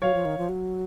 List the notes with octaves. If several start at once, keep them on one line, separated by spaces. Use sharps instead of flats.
F#3 C#5 F5
F3
D#3
F3
F#3